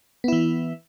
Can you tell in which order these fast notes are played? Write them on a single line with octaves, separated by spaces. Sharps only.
B3 E4 E3